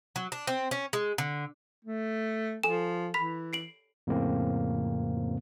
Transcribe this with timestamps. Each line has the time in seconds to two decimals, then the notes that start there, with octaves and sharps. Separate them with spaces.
0.16 F#3
0.32 D4
0.47 C4
0.71 C#4
0.93 G#3
1.18 D3
1.85 A3
2.63 F3 A4 G#5 E7
3.14 E3 B5 B6 F7
3.53 C7 D7 F#7
4.07 F2 A2 C#3 A#3 C4